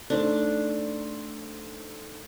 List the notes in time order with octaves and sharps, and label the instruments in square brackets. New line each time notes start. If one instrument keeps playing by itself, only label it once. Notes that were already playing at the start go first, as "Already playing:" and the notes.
[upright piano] A3 D#4 C5 [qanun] D4